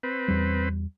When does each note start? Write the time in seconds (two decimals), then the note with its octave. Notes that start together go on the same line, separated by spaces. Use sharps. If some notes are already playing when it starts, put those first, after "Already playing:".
0.03 C4 B4
0.28 E2 G3